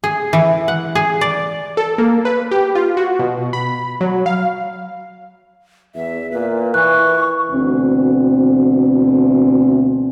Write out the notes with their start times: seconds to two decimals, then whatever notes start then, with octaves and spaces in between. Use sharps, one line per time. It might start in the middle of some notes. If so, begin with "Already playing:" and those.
0.04 G#4
0.33 E3
0.68 F#5
0.95 G#4
1.21 D5
1.77 A4
1.98 A#3
2.25 B4
2.51 G4
2.75 F4
2.97 F#4
3.19 B2
3.53 B5
4.01 F#3
4.26 F5
5.95 E2 E5
6.32 A#2 B4
6.74 E3 C#6 F#6
7.50 D2 B2 E3 C4